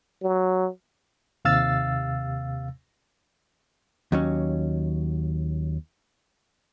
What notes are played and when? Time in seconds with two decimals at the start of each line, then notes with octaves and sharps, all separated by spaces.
0.22 F#3
1.45 D#2 C3 F5 E6 A6
4.12 D#2 F#3 C#4